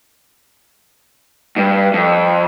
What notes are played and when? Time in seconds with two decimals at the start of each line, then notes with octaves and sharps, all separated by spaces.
1.56 G2
1.93 F2